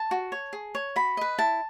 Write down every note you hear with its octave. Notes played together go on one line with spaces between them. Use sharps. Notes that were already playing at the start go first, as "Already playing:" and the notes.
Already playing: A5
F#4
C#5
G#4
C#5
F#4 B5
B4 D#5
E4 A5